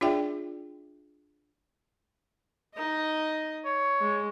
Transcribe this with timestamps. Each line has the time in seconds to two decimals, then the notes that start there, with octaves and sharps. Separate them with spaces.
0.01 D4 F4 G#4 D5 E5 G5
2.75 D#4 D#5
3.65 C#5
4.00 G#3